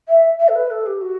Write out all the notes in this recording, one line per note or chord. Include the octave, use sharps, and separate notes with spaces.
E5
E5
A4
B4
A4
G4
F#4